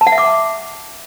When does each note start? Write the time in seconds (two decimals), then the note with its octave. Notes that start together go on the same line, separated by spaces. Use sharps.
0.01 A5
0.07 F#5
0.12 E5
0.18 D6